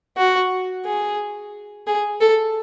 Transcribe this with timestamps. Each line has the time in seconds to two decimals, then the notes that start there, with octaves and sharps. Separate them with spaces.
0.17 F#4
0.85 G#4
1.87 G#4
2.20 A4